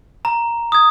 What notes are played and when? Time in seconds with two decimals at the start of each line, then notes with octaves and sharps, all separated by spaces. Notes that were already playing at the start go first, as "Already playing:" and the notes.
0.25 A#5
0.72 D#6 G#6